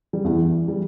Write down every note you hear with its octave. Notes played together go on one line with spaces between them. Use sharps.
G3
E2 E3
G3